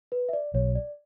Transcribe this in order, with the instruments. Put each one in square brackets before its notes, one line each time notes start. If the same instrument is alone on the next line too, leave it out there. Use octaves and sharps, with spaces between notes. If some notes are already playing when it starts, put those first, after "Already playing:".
[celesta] B4
E5
D5
[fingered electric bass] B1 B2 F#3 [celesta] C#5
[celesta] D5